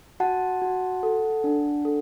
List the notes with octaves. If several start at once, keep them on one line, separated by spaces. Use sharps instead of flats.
F#4 F#5 A5
F#4
A4
D4
A4